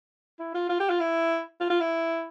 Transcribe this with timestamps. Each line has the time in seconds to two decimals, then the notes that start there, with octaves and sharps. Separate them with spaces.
0.39 E4
0.54 F4
0.69 F4
0.80 G4
0.90 F4
1.00 E4
1.60 F4
1.70 F4
1.80 E4